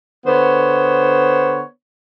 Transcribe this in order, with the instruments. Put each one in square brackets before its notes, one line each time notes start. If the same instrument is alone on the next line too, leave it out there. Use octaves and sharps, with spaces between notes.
[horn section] D3 B3 C5 C#5